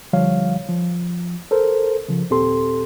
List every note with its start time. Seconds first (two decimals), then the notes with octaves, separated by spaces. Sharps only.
0.13 C2 D3 F3 G3 C#5 F5
0.68 F3
1.51 A4 A#4 C5
2.08 C#3 F3
2.30 D#2 A#2 C4 G4 A4 C6